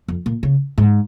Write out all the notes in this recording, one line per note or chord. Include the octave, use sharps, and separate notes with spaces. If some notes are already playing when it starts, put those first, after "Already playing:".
F2
A#2
C#3
G#2